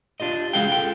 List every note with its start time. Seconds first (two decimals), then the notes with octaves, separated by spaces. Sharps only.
0.20 D4 F4 G4 D#5
0.53 G#3 C#4 F#4 G#4 F5 G5
0.70 F4 A4 G5